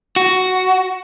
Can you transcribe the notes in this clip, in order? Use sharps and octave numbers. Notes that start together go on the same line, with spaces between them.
F#4